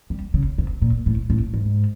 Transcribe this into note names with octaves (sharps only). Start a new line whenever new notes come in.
G3
C#3
C3
A#2
A2
A2
G#2